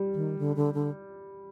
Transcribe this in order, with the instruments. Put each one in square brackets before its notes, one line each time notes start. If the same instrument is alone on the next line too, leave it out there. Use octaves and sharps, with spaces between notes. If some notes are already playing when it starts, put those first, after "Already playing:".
Already playing: [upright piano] G3
[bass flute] D#3
D3
D3
D3